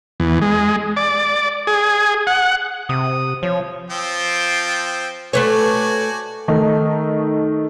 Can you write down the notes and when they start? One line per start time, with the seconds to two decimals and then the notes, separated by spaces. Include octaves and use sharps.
0.20 E2
0.42 G#3
0.97 D5
1.67 G#4
2.27 F#5
2.89 C3 D#6
3.43 F3 C#5
3.90 F3 C4 G5
5.33 A3 F#4 B4 C#5 D5 G#5
6.48 D#3 A3 D#4